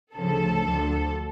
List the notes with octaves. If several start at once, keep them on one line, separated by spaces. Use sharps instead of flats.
D2 C#3 F3 A4
D2 D3 F3